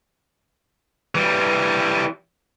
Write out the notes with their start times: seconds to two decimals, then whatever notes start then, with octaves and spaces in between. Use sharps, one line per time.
1.15 E3 G3